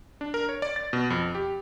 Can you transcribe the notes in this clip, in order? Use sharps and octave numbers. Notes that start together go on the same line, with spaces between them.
D4
A#4
C#5
D5
A6
B2
F2
G4